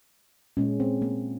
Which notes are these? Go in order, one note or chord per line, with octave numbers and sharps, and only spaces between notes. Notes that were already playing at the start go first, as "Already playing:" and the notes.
A#2 G#3 C#4
C4
A#3